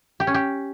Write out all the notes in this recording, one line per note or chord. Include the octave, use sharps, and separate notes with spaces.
G4
C#4
G4